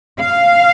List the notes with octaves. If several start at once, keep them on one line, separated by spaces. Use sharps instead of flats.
F5